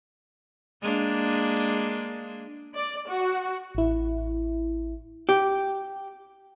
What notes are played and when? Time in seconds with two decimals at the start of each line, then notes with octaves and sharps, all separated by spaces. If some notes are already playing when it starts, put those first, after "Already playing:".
0.82 G#3 A#3 D4
2.74 D5
3.08 F#4
3.75 A1 E4
5.29 G4